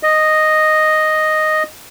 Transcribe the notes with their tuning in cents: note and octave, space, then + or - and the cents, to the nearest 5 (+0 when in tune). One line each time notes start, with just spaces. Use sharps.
D#5 -5